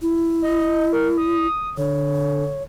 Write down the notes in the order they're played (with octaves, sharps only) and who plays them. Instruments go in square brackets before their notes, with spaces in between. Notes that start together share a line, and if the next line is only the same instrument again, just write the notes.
[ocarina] E4
[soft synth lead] D#5
A#4
D#6
[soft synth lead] D3 [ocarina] C#5